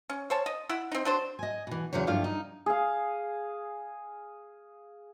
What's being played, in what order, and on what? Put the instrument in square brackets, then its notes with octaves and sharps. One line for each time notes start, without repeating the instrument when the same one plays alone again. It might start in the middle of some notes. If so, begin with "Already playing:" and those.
[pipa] C#4
C5 C#5 A5
D#5
E4 E5 F#5
C4 D#4
F#3 D4 C5
[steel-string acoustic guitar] D#5 G#5
B2 E3
E2 C#3 F#3 C5 C#5
G2 F3 A3 E4 F4 F5
D#4
[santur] G#4 F5